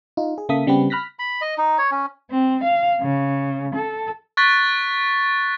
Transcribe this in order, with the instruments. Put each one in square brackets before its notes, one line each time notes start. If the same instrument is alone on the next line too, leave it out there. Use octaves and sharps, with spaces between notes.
[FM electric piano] D#4 F4
G#4
C#3 A#3 A4 E5 D#6 B6
C#3 G3 B3 C4 G4 B4
B5 F6 F#6 A#6 B6
[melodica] B5
D#5
D#4
C#5
C#4
[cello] C4
F5
C#3
A4
[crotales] C#6 F#6 A6 B6